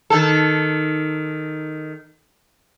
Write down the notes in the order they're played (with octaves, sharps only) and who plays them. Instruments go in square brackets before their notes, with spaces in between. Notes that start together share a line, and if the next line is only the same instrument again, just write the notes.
[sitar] D#3 A4